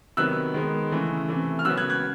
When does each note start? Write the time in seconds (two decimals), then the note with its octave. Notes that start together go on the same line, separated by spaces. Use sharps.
0.17 C3 D#3 F#3 B3 E6 F#6
0.54 D#3 G#3 B3
0.91 C#3 E3 A3
1.28 C3 E3 A3
1.59 F6
1.65 C#3 F#3 B3 E6 F#6
1.77 F#6 G#6
1.90 F#6 G#6